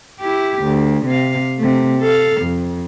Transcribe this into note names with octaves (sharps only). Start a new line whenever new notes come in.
E4 G4
D2
C3 F5
C3 A3
A4 F5
F2